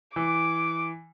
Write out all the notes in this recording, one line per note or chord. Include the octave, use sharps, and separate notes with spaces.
E3 D6